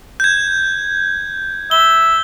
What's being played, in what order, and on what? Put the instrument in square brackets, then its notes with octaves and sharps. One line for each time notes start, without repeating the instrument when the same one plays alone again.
[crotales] G6 G#6
[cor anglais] E5 [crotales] G7